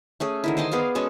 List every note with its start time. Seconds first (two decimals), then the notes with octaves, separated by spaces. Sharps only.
0.20 A3 C#4 G#4
0.44 D3 D#3 E4
0.57 C5 D#5 G#5 A5
0.72 B3 G#4 D5 F5
0.95 G#3 C#4 F#4 A4